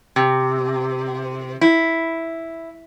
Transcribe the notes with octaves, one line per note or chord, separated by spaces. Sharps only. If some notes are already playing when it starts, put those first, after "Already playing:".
C3
E4